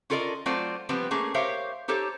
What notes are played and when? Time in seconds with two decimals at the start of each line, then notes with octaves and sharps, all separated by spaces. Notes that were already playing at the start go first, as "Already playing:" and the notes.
0.10 C#4 F4 A4 A#4 D5 D#5
0.46 F#3 A3 C4 F4 C5 D5
0.89 F3 G3 B3 C4 B4
1.11 A3 A#3 C#4 G#4
1.34 G4 A#4 C5 C#5 E5 F5
1.88 D#4 G4 A4 C5 C#5